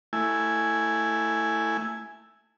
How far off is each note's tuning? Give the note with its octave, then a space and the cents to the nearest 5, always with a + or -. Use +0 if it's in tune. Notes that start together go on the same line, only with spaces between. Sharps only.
A3 +20 E4 +0 G#5 +0